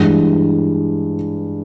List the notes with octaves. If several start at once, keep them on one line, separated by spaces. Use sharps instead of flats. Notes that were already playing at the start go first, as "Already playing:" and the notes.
Already playing: G2 E3 G#3